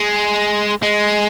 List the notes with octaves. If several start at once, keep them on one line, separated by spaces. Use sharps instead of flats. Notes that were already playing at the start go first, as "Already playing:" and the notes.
Already playing: G#3
G#3